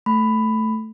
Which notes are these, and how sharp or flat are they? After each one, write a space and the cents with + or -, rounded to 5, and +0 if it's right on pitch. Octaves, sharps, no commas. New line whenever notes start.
A3 +0 B5 +10